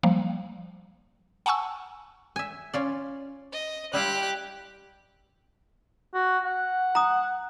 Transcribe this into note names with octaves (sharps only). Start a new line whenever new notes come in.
F3 G3 A#3
F#5 G#5 A5 C#6 E6
E5 G#5
C#4 F4 D5
D#5
G3 E4 F4 G4 F#6
F#4
F#5
A#5 D#6